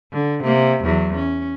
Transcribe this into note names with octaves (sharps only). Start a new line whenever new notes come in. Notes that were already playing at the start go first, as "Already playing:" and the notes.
D3
C3 A#3
E2 F#3
C#4